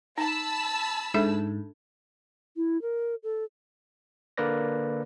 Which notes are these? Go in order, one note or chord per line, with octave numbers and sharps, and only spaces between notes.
D#4 A5 B5 E6
G#2 D4 A4 E5
E4
A#4
A4
D3 A#3 A#4 B4 D5 A#6